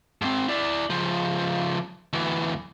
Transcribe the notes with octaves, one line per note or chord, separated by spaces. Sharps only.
G#2 C4
E4 D5
C#3 F3
D2 E3